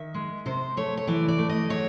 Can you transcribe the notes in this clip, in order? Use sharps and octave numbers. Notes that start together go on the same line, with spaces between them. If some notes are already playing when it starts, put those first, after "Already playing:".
Already playing: D#3 E5
G#3
C3 C5
A3 C#5
C#5
E3 D5
D5
A3
D#5
F#3 C#5